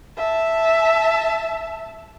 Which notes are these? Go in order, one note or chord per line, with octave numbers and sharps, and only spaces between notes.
E5 A5